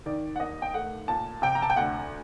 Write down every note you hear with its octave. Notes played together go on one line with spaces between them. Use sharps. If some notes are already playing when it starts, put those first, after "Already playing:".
D#3 D5
F#5
D#2 D#5
G5
A3 F#5
A#2 A5
C3 G5
A#5
A5
G5
D2 F#5